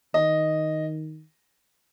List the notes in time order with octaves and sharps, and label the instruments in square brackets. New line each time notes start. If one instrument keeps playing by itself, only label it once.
[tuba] D#3 [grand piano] D#5